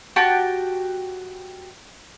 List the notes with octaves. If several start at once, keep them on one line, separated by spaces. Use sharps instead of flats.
F#4 G4 G5 A5